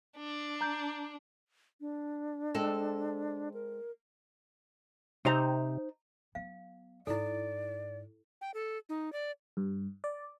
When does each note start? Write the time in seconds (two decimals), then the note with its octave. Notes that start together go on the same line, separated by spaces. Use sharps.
0.18 D4
0.61 A#5 G6
1.81 D4
2.54 G#3 C4 A4
3.54 A#4
5.25 C3 D#4 C5 A#5
6.35 F#3 B3 F5
7.07 G#2 E4 A4 D5
8.41 G5
8.54 A4
8.89 D#4
9.13 D5
9.57 G2
10.04 D5